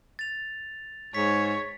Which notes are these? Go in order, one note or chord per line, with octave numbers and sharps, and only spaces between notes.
A6 F7
G#2 C#5 B6